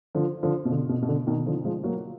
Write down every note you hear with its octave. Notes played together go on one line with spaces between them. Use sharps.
D3 F3
D3 F3
B2
D3
B2
B2
D3
B2 D#3
D3 F3
F3 G#3
F#3 A#3